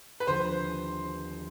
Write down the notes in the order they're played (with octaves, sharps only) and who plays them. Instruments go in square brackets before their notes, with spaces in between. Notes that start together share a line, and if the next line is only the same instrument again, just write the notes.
[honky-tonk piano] B4
[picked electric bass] D#2 D3 F3 [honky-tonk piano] C5